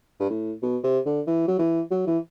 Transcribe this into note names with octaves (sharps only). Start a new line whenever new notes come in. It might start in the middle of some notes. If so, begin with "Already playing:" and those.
G2
A2
B2
C3
D3
E3
F#3
E3
F#3
E3